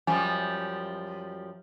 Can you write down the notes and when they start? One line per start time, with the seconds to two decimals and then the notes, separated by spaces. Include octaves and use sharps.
0.07 F#2 F3 G3 G#5